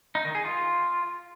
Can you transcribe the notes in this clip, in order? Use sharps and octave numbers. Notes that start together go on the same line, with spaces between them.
D#4
D#3
G#4
F4